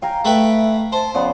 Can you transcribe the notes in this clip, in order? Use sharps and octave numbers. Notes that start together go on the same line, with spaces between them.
F5 G5 G#5 A#5
A3 B4 E5 G5
C5 A5
C#3 F3 B3 D5